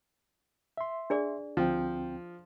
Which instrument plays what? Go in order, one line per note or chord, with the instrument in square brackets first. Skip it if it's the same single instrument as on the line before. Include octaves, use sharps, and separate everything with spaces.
[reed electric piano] E5 C6
[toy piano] D4 G#4 D5
[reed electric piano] D2 C4 G5 [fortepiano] F3